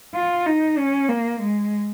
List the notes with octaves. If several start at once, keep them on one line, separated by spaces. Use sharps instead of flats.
F4
D#4
C#4
A#3
G#3